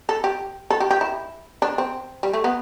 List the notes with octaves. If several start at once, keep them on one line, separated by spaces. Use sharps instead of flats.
A4
G4
A4
G4
G4
E4
D4
C4
G3
A3
B3